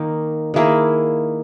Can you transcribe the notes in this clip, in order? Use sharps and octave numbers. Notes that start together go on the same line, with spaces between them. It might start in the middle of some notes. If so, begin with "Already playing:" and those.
Already playing: D#3 A#3 D#4
D#3 A#3 E4 G#4